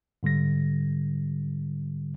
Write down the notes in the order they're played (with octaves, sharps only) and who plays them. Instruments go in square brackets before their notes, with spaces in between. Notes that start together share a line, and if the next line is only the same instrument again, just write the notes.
[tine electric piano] G#2 D3 G3 A#6